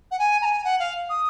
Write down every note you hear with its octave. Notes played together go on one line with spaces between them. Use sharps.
F#5
G#5
A#5
G#5
F#5
F5
D#6